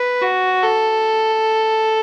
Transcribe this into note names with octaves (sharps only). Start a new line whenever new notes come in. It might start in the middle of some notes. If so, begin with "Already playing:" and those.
Already playing: B4
F#4
A4